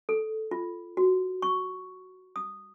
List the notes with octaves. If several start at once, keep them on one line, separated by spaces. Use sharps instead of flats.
A4
F4
F#4
C#6
D#6